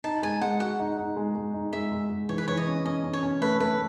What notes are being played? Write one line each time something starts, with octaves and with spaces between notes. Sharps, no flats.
D#4 A5
G#3 G#5
G#3 F#5
F#4 F#5
D#4
D#4
G#3
G#3
D#4
G#3 E5
G#3
G#3
E3 C#5
B4
E3 C#5
D#5
C#4
C#4 D#5
C#4
C#5
C#4
A3 B4
A3 B4